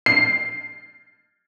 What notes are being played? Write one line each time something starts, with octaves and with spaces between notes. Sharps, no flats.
C7